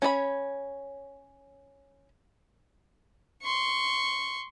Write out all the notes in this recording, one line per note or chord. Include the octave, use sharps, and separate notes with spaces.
C#4 C#5 D5 B5
C6 C#6